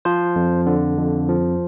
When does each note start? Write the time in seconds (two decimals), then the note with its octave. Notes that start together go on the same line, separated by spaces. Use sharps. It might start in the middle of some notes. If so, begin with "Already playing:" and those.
0.05 F3 C5
0.36 F2
0.66 D3
0.97 F2
1.29 F3